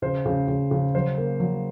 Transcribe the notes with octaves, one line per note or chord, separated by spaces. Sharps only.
C#3 C5
C#3
C#3
C#3
F#3 C5
A#3
F#3